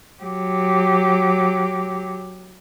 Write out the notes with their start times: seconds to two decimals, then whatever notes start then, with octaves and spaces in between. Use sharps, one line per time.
0.22 F#3 G4